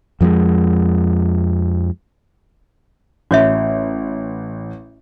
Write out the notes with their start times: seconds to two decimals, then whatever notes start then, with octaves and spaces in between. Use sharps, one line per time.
0.21 F2 F3 G3 G#3
3.31 A1 F#4 C#5 E5